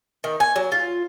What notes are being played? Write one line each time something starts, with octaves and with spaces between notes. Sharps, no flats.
D#3
G#5
F#3
F4